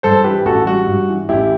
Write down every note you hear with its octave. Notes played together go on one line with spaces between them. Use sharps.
G2 A4 C5
E3 G4 B4
A1 F#4 A4
G3 F#4
G2
E3
A1 E4 G4